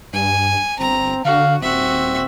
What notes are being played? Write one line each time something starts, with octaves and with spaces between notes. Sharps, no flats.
G2 G#5
G1 C4 A#5
D3 F#4 F5
D#1 C4 F#4 E5